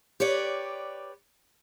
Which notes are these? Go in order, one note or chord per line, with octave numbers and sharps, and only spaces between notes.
G4 B4 C#5 D5